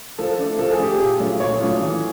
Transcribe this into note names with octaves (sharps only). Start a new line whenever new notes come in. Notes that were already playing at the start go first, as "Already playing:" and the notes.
F3 A4
A3 D4
F3 A4
G#4
A3 D4 G4
A#2 G#4
F#3 A3 D4 F4
A#2 C#5
F#3 A3 D4 F4
E3